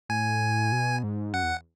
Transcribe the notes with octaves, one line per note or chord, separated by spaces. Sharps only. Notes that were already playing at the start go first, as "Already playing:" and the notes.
A2 G#5
B2
G#2
F#2 F#5
E2